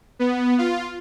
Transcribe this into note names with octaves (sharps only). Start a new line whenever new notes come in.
B3
F4